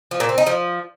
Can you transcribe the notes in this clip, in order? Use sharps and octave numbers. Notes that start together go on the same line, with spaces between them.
F3
A#2
C4
D#4
F3